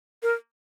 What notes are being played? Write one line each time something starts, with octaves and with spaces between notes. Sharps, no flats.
A#4